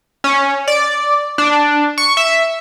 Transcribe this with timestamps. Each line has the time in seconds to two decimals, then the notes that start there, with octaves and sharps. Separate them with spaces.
0.24 C#4
0.68 D5
1.38 D4
1.98 C#6
2.17 E5